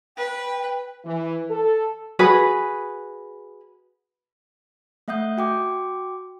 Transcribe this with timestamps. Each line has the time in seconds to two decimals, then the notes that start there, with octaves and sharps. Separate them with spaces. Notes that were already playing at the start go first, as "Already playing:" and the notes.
0.17 B4 G5
1.05 E3
1.50 A4
2.19 F#4 G#4 B4
5.08 A3 E5 F#5 D#6 G6
5.38 F#4 G5 D6